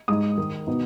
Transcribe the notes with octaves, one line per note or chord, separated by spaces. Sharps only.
G#2 G#3 D#4 D#6
D#3 G#3 D#4
B2 B3 D#4